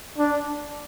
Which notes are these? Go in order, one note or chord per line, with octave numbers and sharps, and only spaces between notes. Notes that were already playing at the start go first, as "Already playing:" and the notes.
D4